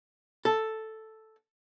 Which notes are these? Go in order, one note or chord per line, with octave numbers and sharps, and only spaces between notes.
A4